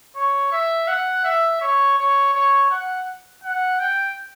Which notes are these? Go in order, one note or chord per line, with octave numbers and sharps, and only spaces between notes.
C#5
E5
F#5
E5
C#5
C#5
C#5
F#5
F#5
G5